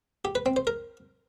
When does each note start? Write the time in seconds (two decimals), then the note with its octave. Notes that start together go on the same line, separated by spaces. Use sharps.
0.25 G4
0.35 B4
0.46 C4
0.56 C5
0.67 A#4